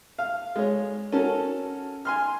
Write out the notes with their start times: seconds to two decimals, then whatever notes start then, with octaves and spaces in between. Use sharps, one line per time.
0.19 F5
0.56 G#3 C#5
1.12 C#4 F#4 A4 A#4
2.05 G#5 C6 F6